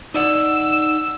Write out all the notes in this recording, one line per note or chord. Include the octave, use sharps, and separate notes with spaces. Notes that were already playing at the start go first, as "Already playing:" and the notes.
D#4 D5 F#5 E6